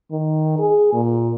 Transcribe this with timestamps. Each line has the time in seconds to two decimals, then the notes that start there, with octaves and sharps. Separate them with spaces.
0.11 D#3
0.59 G#4
0.93 A#2